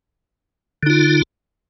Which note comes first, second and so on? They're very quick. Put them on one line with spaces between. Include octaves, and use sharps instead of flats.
D3 D#4 F4